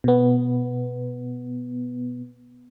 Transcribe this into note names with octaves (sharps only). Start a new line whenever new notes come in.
B2 B3